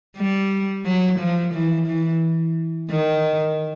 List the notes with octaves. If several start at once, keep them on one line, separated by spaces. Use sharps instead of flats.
G3
F#3
F3
E3
E3
D#3